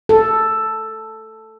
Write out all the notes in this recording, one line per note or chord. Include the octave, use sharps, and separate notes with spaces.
A4